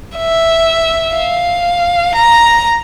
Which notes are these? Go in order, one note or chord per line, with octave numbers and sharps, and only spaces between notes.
E5
F5
A#5